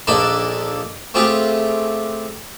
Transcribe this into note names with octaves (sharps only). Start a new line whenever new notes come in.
A#1 A#2 D4 D#4 A4 A5
A3 C4 F4 G4 G#4